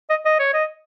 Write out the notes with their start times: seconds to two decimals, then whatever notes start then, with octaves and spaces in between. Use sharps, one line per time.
0.10 D#5
0.25 D#5
0.39 C#5
0.53 D#5